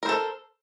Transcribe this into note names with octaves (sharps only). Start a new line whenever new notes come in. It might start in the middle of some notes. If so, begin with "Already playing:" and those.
A4 A#4 C5